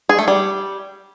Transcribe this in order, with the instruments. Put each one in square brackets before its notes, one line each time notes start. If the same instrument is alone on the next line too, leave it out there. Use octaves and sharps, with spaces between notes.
[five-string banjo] G#4
A3
G3